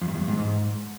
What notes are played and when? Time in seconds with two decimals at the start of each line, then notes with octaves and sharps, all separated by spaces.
0.01 F2
0.08 G2
0.15 E2
0.21 G2
0.28 G#2